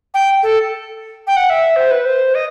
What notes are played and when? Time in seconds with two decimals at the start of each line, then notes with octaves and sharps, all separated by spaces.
0.14 G5
0.43 A4
1.27 G5
1.36 F#5
1.46 F#5
1.50 E5
1.76 C5
1.91 B4
2.05 C5
2.35 D#5